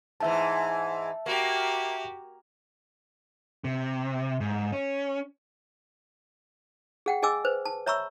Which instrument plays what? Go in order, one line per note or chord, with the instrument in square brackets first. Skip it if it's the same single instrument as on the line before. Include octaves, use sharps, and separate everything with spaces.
[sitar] G#2 E3 [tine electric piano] E5 A5
[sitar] A#3 [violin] F#4 G4
[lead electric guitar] C3
G#2
C#4
[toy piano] G#4 F#5 G5
G#4 D#5 G#5 D6 E6
B4 C5
A5
C#5 E5 A#5 B5 C#6 E6